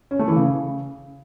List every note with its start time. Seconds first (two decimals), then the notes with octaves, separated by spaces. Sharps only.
0.11 C#4
0.19 A3
0.28 E3
0.36 C#3